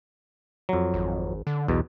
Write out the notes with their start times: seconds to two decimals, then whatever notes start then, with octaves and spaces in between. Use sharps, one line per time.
0.69 F2 F#3
0.94 G#1
1.47 D3
1.68 B1 E2 B2